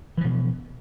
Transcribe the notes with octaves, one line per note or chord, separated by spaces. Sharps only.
B2 E3 F3